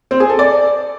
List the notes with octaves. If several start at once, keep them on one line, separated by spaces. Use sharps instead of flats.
C4
G#4
A4
D5